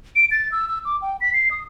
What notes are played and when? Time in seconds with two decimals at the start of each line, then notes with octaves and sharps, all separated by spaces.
0.16 D7
0.31 A6
0.52 E6
0.68 E6
0.85 D6
1.02 G5
1.21 B6
1.33 C7
1.51 D#6